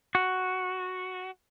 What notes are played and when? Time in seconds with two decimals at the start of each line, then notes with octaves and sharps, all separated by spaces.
0.15 F#4